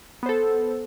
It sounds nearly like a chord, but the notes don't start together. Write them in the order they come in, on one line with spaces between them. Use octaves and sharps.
B3 C5 A4